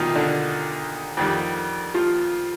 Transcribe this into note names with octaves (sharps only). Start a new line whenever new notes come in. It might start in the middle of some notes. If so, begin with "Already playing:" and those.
Already playing: B1 B2 D#3 F3 G3 D#4 F4
D3 D4
F2 D#3 G3
F3 F4